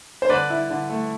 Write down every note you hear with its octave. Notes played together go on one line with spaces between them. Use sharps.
C5
D3 B4 D5
E4
D3
A3